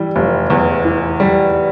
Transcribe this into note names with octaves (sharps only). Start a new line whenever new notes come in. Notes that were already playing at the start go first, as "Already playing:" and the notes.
Already playing: E3 G3
F1
E2
E3
G3